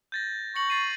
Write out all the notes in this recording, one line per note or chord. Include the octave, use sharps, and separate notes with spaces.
G6 A6 A#6
C#6 A#6 C#7 F#7
A6 C7 D#7